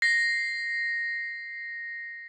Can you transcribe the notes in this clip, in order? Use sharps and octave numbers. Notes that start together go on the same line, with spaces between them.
A#6 C7